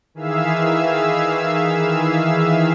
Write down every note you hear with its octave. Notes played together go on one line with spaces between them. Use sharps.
D#3 E3 G#4 E5 F5 E6